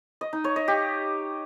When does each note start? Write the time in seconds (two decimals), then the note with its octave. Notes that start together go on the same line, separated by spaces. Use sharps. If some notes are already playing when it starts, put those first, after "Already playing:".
0.21 D#5
0.33 D#4
0.44 C#5
0.56 D#5
0.68 G4